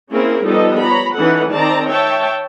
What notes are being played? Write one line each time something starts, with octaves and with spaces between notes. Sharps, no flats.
A#3 C4 C#4 E4 G#4 A#4
F3 G3 B3 D#4 A4 D#5
C#5 A#5 B5
E3 C#4 D#4 A4 B4 F#5
D#3 C4 D5 A5 A#5
C#5 E5 G5 A5